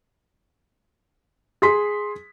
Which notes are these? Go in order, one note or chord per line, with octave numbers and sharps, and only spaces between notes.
G#4 C6 B6